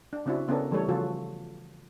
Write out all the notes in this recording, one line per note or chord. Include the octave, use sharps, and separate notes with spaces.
D4
C#3 C4 D4 E4 F#4
C#3 B3 C#4 D4 A4 A#4
E3 G3 A3 A4 C#5
C#3 F3 F4 F#4 A4